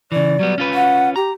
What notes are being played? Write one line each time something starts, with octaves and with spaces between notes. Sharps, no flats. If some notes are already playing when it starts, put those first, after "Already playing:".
C#3 E3 D5
F#3 G3 B3
C#4 F4 B4
F#5
G4 A#5